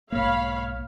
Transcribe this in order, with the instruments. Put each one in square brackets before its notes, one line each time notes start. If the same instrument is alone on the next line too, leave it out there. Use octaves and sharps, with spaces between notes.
[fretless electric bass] B1 G#2 A#3 [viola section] C#5 F5 B5